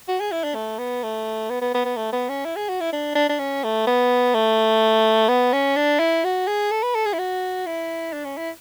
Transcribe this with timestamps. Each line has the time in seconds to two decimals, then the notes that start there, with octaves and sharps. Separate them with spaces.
0.08 F#4
0.20 G#4
0.32 E4
0.44 D4
0.55 A3
0.79 B3
1.03 A3
1.50 B3
1.61 B3
1.74 B3
1.85 B3
1.97 A3
2.13 B3
2.29 C#4
2.45 E4
2.56 G#4
2.69 F#4
2.81 E4
2.93 D4
3.15 D4
3.29 D4
3.39 C#4
3.64 A3
3.87 B3
4.34 A3
5.29 B3
5.53 C#4
5.76 D4
5.99 E4
6.24 F#4
6.47 G#4
6.71 A4
6.83 B4
6.95 A4
7.06 G#4
7.13 E4
7.19 F#4
7.66 E4
8.13 D4
8.25 C#4
8.37 E4